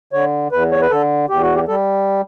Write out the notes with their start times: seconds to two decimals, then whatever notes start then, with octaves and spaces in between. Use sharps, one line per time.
0.13 D3 C#5
0.52 E2 B4
0.71 C#5
0.82 B4
0.91 D3 A4
1.29 E2 G4
1.42 F#4
1.55 G4
1.68 G3 A4